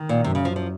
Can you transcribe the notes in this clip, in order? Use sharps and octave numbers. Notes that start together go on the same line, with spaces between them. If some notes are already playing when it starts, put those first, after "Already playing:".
Already playing: D#3
A#2
F#2 C3
C#3
F3
F3